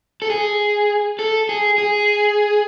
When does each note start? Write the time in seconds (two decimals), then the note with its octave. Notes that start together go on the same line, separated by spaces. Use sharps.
0.22 A4
0.30 G#4
1.19 A4
1.49 G#4
1.78 G#4